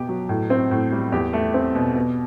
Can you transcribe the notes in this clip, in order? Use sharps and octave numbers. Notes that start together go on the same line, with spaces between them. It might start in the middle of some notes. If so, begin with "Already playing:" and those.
Already playing: B2 B3 G4
F#3
A2
C4
A2
G3
E2 G4
A3
C4
B2
B2